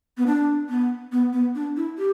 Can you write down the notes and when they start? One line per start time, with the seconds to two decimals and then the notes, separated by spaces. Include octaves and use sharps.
0.18 B3
0.26 D4
0.69 B3
1.12 B3
1.33 B3
1.55 D4
1.77 E4
1.98 G4